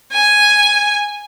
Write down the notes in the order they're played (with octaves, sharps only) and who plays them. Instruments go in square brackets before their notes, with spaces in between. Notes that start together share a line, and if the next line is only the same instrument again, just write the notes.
[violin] G#5